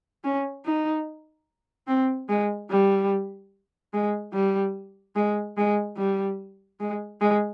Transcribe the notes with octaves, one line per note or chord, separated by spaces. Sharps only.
C#4
D#4
C4
G#3
G3
G#3
G3
G#3
G#3
G3
G#3
G#3